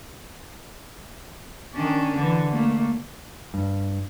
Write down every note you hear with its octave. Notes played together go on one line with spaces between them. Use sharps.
D#3 C#4 D4
D3 E3
A3 A#3
G2